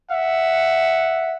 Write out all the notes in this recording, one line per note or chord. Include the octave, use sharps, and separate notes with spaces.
E5 F#5